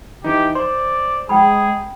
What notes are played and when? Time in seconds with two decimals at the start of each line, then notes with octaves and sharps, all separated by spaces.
0.24 E3 D#4 G4
0.55 C5 D5 C6
1.29 G#3 G#4 G5 A#5 B5